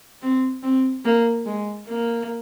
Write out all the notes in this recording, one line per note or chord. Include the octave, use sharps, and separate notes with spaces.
C4
C4
A#3
G#3
A#3